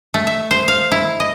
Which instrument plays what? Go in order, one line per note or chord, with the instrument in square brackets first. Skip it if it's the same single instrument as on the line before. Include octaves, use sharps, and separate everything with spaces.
[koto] A3
E5
C5
F5
E4
D#5